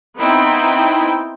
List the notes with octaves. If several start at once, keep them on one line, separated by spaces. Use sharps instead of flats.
B3 C4 D#4 E4 G5